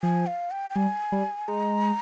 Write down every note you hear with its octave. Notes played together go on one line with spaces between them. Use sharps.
F3 G#5
F5
G5
G5
G3 G#5
G3
G#3 A#5